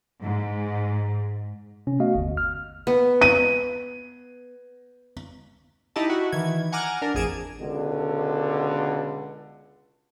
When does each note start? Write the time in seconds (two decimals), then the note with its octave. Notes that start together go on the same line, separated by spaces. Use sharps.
0.22 G#2
1.87 C3 C#4
2.00 A3 B3 F#4 D#5 F5
2.15 G1 D#2
2.37 F6
2.87 B3
3.21 D#7
5.96 D#4 E4 G4 D#5 A5
6.08 E4 F#4
6.32 D#3 E3 G#6
6.72 F#5 G#5 A#5 D6 F6
7.02 D4 A#4
7.15 A1 F2 G#4 G#6 D7 E7
7.59 C#2 B2 D3